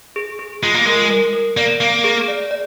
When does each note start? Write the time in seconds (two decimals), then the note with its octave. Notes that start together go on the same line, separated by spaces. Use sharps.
0.16 G#4
0.39 G#4
0.63 G#3 F4
0.74 A#3
0.85 G#3 A#4
1.10 A#4
1.33 A#4
1.57 A#3 D5
1.81 A#3 F5
2.04 G#4
2.28 D5
2.51 D5